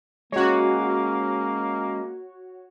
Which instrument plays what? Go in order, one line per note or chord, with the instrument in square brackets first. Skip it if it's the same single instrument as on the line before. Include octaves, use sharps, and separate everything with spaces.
[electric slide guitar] G#3 C#4 [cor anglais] A#3 [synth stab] F#4 C#5